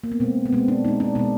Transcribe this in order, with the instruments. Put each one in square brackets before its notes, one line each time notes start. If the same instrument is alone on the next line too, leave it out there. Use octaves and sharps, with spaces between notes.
[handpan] A#3
B3
B2 G#3 C4
B3
B2 G#3 C4
D4
B2 G#3 D#4
D4
B2 G#3 D4